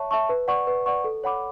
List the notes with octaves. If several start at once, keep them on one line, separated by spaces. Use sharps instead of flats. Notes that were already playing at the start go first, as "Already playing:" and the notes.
Already playing: C#5 E5 A5 C#6
E5 A5 C#6
B4
D5 F#5 C#6
B4
D5 F#5 C#6
A4
C#5 F#5 B5 D6